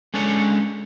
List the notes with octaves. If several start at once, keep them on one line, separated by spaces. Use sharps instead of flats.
G#3 C#4 D4 A4 C#5